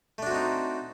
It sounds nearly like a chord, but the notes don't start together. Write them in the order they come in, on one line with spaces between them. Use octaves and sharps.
A3 D4 F#4 C4 D#4